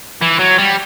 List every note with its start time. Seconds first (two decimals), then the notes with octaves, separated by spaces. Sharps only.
0.21 E3
0.39 F#3
0.58 G3